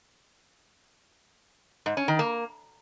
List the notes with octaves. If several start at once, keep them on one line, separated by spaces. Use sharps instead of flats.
G#2
C#4
D#3
A#3